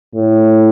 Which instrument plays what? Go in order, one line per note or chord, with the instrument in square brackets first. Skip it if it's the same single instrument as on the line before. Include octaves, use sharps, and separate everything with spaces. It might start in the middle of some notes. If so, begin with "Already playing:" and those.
[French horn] A2